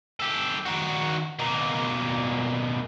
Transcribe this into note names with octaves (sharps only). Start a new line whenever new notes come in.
G4 A4
D#3 F#4
B2 A#3